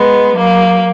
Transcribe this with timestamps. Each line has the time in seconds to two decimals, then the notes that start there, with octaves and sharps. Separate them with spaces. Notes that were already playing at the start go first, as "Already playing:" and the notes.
Already playing: G#3 B3
0.36 F#3 A#3